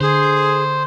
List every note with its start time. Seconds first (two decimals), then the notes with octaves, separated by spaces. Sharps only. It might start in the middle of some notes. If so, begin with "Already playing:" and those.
0.01 D3 G#4 C5